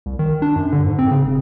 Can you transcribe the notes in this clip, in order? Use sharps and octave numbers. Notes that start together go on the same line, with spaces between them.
C2
D#3
D4
F#2
D3
G#2
C4
C#3
E1